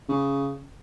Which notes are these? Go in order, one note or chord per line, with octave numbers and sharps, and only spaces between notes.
C#3